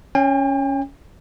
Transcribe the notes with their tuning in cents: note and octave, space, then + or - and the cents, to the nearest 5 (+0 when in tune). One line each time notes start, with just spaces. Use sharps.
C#4 +0 G5 +40